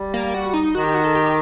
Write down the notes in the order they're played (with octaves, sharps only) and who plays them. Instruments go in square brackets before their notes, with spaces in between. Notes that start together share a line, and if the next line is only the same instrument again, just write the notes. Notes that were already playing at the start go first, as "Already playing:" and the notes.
Already playing: [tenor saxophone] G3
[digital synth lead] A#3
F#4
D#4
[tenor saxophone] D#3 [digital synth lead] F#4
[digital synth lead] G4
F#4
A4
G4